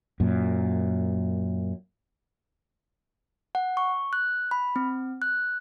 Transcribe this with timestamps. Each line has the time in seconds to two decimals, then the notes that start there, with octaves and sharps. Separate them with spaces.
0.20 F#2 A#2
3.55 F#5
3.77 C#6
4.13 F#6
4.51 B5
4.76 C4
5.22 F#6